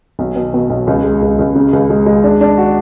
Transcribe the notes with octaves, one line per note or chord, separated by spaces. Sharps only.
B1
B2
B2
B1
C#2
G#3
C#2
C#2
C#3
C#2
G#3
G#3
D4
D4
F#4